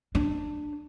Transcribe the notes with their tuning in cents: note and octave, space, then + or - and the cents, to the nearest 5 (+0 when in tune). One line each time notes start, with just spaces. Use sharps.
D4 +15